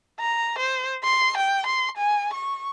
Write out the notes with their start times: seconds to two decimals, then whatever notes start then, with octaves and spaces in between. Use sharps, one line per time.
0.20 A#5
0.58 C5
1.04 C6
1.37 G5
1.66 C6
1.97 G#5
2.34 C#6